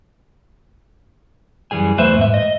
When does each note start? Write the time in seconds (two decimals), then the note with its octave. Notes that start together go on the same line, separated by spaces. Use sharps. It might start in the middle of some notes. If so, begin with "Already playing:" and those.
1.71 F#2 E3 G3 G#4 G#5
1.98 E2 A3 B4 C5 E5
2.18 G#2 E5
2.34 D#5